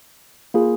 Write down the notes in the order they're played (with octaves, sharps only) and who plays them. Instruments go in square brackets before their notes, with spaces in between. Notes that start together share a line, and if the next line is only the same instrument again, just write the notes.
[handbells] A#3 F4 G#4